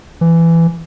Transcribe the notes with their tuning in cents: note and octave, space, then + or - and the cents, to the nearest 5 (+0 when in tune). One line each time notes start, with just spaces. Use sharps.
E3 +15